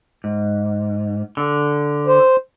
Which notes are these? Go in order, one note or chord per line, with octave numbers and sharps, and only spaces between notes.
G#2
D3
C5